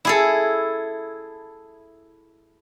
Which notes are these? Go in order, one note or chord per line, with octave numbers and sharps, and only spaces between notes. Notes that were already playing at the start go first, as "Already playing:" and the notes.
E4 G#4 A4